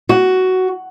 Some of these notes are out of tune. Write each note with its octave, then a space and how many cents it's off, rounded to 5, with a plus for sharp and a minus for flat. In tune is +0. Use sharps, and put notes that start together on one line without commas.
F#4 +10